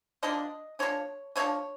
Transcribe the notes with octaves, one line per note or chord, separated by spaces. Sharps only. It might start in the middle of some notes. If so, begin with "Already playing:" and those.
D3 F3 A#3 D4 D#5
D3 F3 A#3 D4 C#5
D3 F3 A#3 D4 C#5